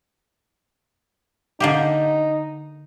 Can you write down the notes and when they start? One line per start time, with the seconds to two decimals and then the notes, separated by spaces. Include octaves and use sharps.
1.60 D3 A#3 D#4 G4